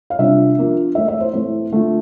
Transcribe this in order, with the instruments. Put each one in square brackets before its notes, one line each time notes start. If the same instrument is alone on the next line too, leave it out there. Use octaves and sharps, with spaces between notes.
[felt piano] F5
C3 G3 D4 F4 E5
F3 A#3 D4 F4
E3 A3 E4 E5
E5
C5
A2 E3 A3 C4 E4 C5
D3 A3 D4 F4